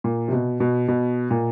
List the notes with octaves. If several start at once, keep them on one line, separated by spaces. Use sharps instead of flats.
A#2
C3
B2
B2
B2
A#2